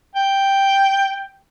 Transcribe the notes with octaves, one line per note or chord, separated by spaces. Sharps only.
G5